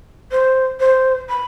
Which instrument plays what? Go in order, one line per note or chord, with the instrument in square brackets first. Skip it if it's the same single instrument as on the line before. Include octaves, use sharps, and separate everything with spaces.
[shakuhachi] C5
C5
B5